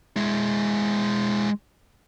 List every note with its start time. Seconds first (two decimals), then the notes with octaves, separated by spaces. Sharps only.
0.17 G#3 E4